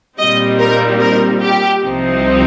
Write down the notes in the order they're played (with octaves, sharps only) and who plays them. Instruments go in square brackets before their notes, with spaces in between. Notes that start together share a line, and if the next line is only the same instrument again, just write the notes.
[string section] A#2 G3 C4 D#4 D#5
A#4
A#4
G4
C2 C3 F3 C4 D#4